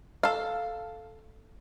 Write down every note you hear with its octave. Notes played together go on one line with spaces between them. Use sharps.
A4 F5